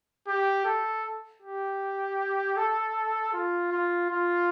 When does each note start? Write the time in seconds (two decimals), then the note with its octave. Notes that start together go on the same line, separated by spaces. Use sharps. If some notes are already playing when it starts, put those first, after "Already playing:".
0.27 G4
0.65 A4
1.42 G4
2.57 A4
3.33 F4
3.71 F4
4.09 F4